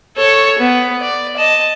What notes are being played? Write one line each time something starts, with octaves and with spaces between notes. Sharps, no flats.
A4 C#5
B3
D5
D#5 A5